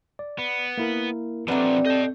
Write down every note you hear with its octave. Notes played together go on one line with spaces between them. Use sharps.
D5
B3
A#3 E4 A#4
F3 G3 A3 C4 D4 B4 F#5 A#5
A4 D#5 A5 G6